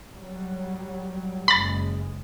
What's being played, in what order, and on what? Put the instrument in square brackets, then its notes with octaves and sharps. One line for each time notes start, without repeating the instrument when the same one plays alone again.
[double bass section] F#3 G3
[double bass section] F#1 G#3 [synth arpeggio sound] B5 A6